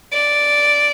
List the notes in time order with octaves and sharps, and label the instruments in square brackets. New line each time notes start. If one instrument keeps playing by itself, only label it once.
[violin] D5